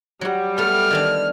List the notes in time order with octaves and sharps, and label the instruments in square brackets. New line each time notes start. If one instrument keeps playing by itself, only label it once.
[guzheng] F#3 F#4 [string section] G3
[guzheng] A3 B3 [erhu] F6
[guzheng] D#3 E3 D4